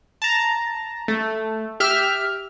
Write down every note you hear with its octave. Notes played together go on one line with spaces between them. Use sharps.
A5 A#5
A3
G4 E5 F6